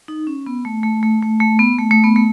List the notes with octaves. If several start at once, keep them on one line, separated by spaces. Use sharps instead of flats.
D#4
C#4
B3
A3
A3
A3
A3
A3
B3
A3
A3
B3
A3